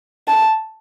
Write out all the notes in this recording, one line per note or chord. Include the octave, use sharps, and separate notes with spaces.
A5